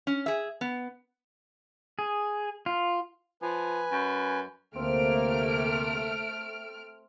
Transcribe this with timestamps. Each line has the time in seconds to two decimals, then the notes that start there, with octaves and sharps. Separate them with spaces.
0.07 C#4
0.26 G#4 E5
0.61 B3
1.99 G#4
2.66 F4
3.42 F3 B4 G#5
3.92 F#2
4.75 D2 C3 A3 A#3 C4 F6 D7